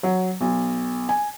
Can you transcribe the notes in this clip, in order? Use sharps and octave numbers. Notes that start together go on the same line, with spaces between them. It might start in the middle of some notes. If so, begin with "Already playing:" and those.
F#3
B1
G#5